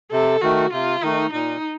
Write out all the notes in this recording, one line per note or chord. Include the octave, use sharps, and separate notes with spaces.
C3 A4
D#3 A3 F#4
C3 F4
D#3 A3 D#4
A#2 D#4